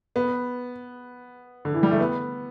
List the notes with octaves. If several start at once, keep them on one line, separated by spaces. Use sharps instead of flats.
B3
D3
E3
G3
A3
B3